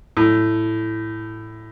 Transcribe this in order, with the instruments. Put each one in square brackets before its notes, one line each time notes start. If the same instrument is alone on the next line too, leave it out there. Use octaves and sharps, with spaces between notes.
[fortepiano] A2